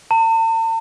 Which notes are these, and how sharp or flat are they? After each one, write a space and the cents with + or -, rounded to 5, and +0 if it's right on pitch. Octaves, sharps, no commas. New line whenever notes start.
A5 +45